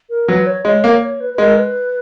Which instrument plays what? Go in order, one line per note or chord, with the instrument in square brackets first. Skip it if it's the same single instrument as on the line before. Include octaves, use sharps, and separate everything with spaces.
[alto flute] A#4
[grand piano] F#3 [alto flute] B4
[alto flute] C#5
[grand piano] G#3 [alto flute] C#5
[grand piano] A#3
[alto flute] C#5
B4
B4
[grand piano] G#3 [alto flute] A#4
[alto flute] B4